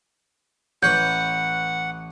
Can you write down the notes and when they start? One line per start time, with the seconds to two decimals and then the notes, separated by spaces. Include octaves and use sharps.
0.83 A1 B4 C#5 F#5 G6